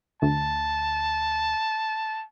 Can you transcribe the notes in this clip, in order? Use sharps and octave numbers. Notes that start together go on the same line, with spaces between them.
D2 A5